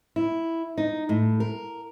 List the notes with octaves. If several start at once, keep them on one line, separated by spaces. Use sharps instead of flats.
E4
D#4
A2
A#4